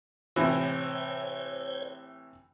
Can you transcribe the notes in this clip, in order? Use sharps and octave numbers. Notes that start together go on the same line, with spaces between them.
A2 C3 E3 C5 C#5